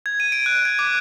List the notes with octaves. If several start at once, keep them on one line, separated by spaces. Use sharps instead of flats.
G#6
D#7
D7
F#6
G#6
D6